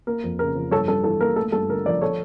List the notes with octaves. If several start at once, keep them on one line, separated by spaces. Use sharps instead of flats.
A#3 A#4
F2
C#3 A#4
F3
G2 A4 C#5
G2 A4
E3 A4
A#3 A#4
A3 A4
G2 A4
D3 A#4
F3 A#4 D5
A4 C#5